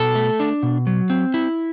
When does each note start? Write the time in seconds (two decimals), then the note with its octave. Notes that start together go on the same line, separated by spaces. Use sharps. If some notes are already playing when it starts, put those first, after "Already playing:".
Already playing: B2 A4
0.15 A3
0.40 D4
0.63 B2
0.87 F#3
1.10 C4
1.34 E4